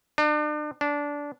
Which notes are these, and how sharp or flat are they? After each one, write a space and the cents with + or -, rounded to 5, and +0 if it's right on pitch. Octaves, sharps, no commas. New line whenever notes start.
D4 +40
D4 -15